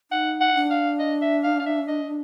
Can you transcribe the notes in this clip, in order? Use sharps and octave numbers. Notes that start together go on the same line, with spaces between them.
D#4 F#5
F#5
D4
F5
D#5
E5
F5
F5
E5
D#5